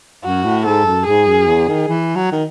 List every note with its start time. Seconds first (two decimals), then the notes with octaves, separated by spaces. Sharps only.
0.24 F#2 F#4
0.44 A2
0.65 G#2 A4
0.85 F#2
1.06 G#2 G#4
1.27 F#2
1.47 E2
1.68 D#3
1.88 E3
2.16 F#3
2.32 D#3